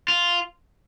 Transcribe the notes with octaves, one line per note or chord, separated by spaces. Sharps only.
F4